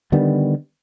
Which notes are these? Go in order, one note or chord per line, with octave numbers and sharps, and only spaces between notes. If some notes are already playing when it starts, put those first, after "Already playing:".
D3 D#3 G3 B3